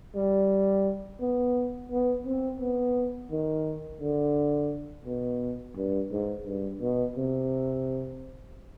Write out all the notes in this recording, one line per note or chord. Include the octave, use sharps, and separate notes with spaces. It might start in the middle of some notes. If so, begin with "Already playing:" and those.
G3
B3
B3
C4
B3
D#3
D3
B2
G2
G#2
G2
B2
C3